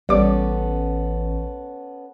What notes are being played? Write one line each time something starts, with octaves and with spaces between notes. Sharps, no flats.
A1 G3 B3 C#4 A4 D6